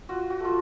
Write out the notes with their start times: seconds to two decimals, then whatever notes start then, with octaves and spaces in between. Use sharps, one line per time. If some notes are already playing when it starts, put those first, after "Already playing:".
0.09 F4 F#4
0.30 F#4
0.40 A3 F4